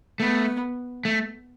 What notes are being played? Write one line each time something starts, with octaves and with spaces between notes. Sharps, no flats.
A3 B3
A3